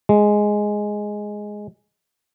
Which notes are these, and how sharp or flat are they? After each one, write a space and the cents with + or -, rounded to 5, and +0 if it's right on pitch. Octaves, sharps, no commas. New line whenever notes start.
G#3 +0